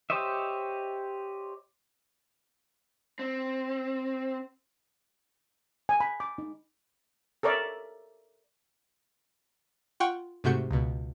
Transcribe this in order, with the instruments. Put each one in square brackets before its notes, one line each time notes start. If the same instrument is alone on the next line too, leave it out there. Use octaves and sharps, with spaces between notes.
[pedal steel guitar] G4 C5 C#5 D#5 E5
[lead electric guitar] C4
[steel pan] G#5
B5
D6
D#4
A4 A#4 C#5 D5 E5
[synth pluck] F4 F#5 G5 C#6
G#2 C3 A3 F#4 G6 C#7
C#2 B2